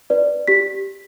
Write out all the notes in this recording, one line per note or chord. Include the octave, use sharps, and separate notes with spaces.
B4 D5
G4 B6